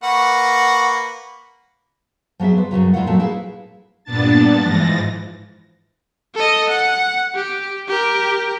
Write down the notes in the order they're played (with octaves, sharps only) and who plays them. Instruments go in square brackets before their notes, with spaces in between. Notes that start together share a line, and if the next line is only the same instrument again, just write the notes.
[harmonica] A#3 B4 C#6 [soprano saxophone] F#5
[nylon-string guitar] F3 F#3 B3 G#4 E5
F4 B4 C5
F#2 A#2 C#3 F#3
G#3 E4 F4 C#5 F5 F#5
A#2 F3 F#3 A3 C4
E4 G#4 B4 F5
[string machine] G2 A#2 B3 D4 A5 A6
G#2 E3 F3 A6 A#6
[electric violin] A4 D#5
F#5
G4
G4 A#4